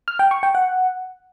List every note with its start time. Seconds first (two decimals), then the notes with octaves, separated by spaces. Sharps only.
0.08 F6
0.19 G5
0.31 C#6
0.43 G5
0.55 F#5